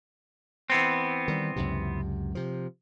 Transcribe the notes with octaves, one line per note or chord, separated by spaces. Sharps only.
E3 B3 C4
D#3 G3
C#2 F#2 C3
C3 F3